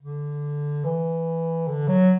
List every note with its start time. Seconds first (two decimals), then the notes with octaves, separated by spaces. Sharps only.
0.02 D3
0.85 E3
1.68 D3
1.88 F#3